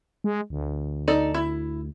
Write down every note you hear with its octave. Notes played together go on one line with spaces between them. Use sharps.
G#3
D2
D#4 A4 D5
E4